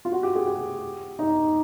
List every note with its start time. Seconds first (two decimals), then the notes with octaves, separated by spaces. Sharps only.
0.05 F4
0.12 F#4
0.23 G4
0.35 G#4
0.47 G4
1.19 D#4